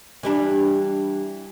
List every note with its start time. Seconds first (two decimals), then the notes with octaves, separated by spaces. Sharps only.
0.23 E3 G3 D4